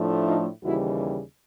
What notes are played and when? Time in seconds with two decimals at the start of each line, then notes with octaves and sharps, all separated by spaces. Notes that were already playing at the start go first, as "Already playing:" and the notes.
Already playing: A2 F3 A3 D4
0.25 D#4 F4
0.62 D#2 C#3 E3 G3 E4 F#4